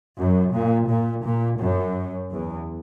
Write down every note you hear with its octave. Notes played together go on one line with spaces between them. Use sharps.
F#2
A#2
A#2
A#2
F#2
E2